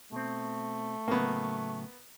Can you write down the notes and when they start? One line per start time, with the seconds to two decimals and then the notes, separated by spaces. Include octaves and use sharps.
0.12 B2 A3 C4
1.08 A2 C#3 F#3 A#3 B3